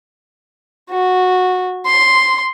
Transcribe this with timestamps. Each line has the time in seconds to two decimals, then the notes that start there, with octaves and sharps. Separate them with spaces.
0.91 F#4
1.86 C6